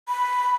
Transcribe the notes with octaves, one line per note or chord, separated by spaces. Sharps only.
B5